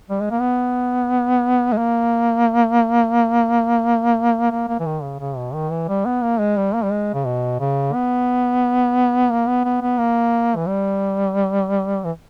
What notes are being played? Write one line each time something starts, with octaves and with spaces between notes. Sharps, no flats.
G3
G#3
A#3
B3
G#3
A#3
A#3
A#3
E3
D#3
C#3
C#3
B2
D#3
E3
G3
B3
A#3
G#3
G3
A#3
G3
G#3
C#3
B2
C#3
B3
A#3
B3
B3
B3
A#3
E3
G3
E3